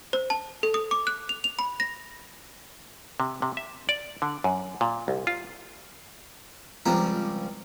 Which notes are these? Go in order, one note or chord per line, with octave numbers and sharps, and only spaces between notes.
C5
A5
A4
D#6
D6
F#6
F7
F7
B5
A#6
C3
C3
E5
D5
D3
F#2
A#2
C2
F4
C#2 F3 G3 C4 A#5